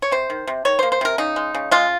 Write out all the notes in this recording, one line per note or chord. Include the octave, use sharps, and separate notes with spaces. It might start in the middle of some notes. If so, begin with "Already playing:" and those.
C#5
C3 C5
D#3
C3
D#3 C#5
A#3 C5
C5
C3 A#4
C#3 D#4
G#3
C#3
G#3 F4